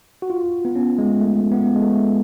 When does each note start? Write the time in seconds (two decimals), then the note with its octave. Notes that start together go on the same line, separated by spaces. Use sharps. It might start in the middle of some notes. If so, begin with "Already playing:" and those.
0.22 F#4
0.30 F4
0.65 B3
0.76 C#4
0.98 G#3
1.21 A3
1.51 B3
1.75 G#3
1.81 A3